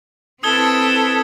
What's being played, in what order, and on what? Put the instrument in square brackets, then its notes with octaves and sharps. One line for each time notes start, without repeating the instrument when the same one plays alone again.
[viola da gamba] C4 E4 B4 [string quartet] A4 [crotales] D#6 G#6 G7